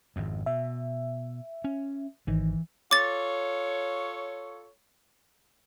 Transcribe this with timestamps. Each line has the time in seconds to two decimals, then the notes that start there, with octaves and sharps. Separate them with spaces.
0.16 G#1 F2
0.46 B2 E5
1.64 C#4
2.27 G#1 D#3 E3
2.91 F4 A4 C#5 D6 A6